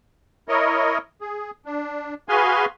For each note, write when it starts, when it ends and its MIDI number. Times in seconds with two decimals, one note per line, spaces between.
0.48 0.98 64
0.48 0.98 70
0.48 0.98 73
0.48 0.98 75
1.21 1.51 68
1.65 2.14 62
2.29 2.65 66
2.29 2.65 68
2.29 2.65 71
2.29 2.65 77
2.29 2.65 80
2.29 2.65 84